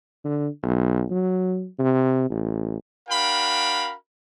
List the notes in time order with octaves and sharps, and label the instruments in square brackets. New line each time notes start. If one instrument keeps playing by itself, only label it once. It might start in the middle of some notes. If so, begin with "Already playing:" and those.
[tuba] D3
B1
F#3
C3
A1
[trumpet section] D4 F#4 A#4 F5 G5 B5